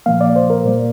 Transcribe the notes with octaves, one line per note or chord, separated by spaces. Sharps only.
A#2 F3 A#3 F5
D5
C5
A#4
A#2 G3 A#3